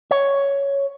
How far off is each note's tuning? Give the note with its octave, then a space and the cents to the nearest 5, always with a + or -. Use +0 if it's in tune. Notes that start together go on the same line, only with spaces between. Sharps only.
C#5 +5